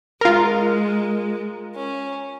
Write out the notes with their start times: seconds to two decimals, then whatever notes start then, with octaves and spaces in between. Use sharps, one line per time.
0.21 G#3 F4 A#4
1.75 C#4